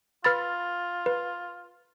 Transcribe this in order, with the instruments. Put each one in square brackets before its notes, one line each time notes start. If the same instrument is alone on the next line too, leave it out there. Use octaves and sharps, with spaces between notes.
[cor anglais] F4 [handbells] B4 B5 E6 [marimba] F6 A6
[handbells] B4